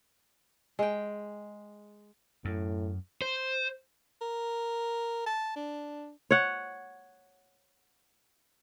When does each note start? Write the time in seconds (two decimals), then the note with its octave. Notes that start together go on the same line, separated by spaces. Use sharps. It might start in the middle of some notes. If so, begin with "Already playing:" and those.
0.79 G#3 G5
2.45 F#2 A2
3.22 C5
4.22 A#4
5.26 A5
5.56 D4
6.31 C#5 F#5